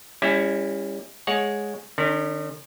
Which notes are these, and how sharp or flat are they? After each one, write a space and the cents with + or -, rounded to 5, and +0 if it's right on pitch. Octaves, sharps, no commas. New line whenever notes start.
G3 +40 C#4 +0 E4 +10
G#3 +0 C#5 +0 F#5 -25
D#3 -45 C#4 +20